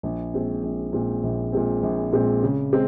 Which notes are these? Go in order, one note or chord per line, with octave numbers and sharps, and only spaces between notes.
A#1
A#2 G#3 C4
A#1
A#2 G#3 C4
A#1
A#2 G#3 C4
A#1
A#2 G#3 C4
C#3
G#3 C4